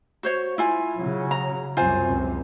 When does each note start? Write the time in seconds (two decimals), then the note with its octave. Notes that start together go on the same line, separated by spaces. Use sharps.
0.23 F#4 C5 C#5
0.58 E4 F4 G#5
0.97 C#3 F#3
1.31 A#5
1.77 C2 F#2 C3 F4 C5 G#5
2.07 C#2 C3